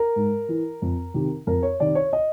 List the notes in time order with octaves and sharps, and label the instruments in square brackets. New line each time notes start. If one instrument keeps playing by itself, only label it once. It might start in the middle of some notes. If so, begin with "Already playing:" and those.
Already playing: [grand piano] A#4
G#2
E3
F2
C3 D#3
F2 A#4
C#5
C3 D#3 D5
C#5
D#5